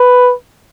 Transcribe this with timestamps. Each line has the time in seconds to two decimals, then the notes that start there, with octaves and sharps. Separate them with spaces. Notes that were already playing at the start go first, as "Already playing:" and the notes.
Already playing: B4